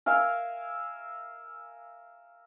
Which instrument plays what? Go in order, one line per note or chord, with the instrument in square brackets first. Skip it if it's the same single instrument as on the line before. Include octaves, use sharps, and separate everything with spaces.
[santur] A#4 E5 F5 G#5